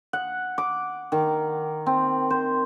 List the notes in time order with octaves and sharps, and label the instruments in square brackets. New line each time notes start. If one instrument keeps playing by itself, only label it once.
[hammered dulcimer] F#5
D6
D#3
C4
C5